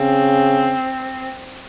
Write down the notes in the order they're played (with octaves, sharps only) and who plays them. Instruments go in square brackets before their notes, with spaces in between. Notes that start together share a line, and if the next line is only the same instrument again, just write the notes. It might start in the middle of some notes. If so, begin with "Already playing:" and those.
Already playing: [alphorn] C#3 [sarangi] C4